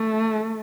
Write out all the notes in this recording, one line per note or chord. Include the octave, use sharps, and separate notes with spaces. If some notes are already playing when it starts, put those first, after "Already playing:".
Already playing: A3